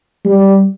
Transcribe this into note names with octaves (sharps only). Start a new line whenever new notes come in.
G3